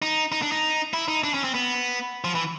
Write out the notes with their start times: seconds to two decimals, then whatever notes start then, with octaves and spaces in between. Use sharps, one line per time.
0.02 D#4
0.32 D#4
0.42 D4
0.52 D#4
0.94 E4
1.08 D#4
1.24 D4
1.34 C#4
1.44 C4
1.54 B3
2.24 F3
2.35 E3